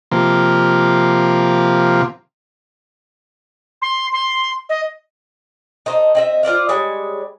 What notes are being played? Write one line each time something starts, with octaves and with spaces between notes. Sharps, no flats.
C3 F3 A#3
C6
C6
D#5
D#4 A4 C5
C4 D#5 E5
F4 C5 D5 F5
G3 G#3 C#5